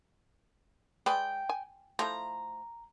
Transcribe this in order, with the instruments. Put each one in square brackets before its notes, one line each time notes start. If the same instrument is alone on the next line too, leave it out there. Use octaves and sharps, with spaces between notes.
[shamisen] G#3 B4 D5 [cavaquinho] G5
[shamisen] G#5
[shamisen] F3 A3 E4 [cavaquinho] A#5